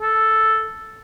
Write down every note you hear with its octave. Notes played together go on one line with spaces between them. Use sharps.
A4